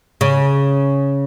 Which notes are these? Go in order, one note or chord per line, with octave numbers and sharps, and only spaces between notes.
C#3